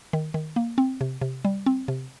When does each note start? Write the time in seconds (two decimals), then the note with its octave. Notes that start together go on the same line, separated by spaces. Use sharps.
0.13 D#3
0.34 D#3
0.56 A#3
0.78 C4
1.01 C3
1.21 C3
1.45 G3
1.66 C4
1.88 C3